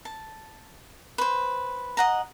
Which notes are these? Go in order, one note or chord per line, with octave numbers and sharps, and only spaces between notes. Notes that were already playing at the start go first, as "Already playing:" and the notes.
A5
B4 C5
D#5 F#5 A#5